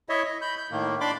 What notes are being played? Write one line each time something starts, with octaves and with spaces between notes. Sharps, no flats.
E4 C#5 D#5 E5
D#5
B5 G6
G6
A2 D#3 A#3
D4 D5 B5 C6 D6